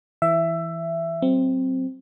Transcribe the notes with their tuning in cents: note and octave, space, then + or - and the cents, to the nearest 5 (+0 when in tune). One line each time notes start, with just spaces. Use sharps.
E3 +0 E5 +15
F#3 +20 C4 +0